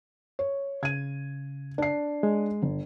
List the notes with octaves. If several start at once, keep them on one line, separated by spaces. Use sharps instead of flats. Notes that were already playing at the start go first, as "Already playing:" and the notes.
C#5
C#3 G#6 D#7
D4 C7
G#3
G1